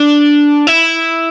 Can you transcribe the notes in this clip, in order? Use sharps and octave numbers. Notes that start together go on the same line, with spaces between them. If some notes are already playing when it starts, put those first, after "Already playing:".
Already playing: D4
E4